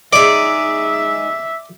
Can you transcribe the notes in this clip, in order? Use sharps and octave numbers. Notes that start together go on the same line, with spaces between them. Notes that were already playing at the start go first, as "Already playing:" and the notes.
G#3 D#4 D5 E5